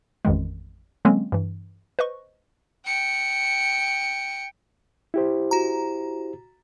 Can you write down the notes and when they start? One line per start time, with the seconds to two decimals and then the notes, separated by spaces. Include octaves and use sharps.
0.25 A1 F2 D#3 G#3
1.05 D3 F#3 G#3 A#3 C4 C#4
1.32 G2 E3
1.99 B4 C5 D#5 C#6
2.86 G5 C#7
5.14 E4 G4 C5
5.51 F#4 A#5